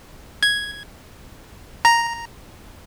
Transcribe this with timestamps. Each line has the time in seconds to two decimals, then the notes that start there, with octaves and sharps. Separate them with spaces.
0.43 G#6
1.85 A#5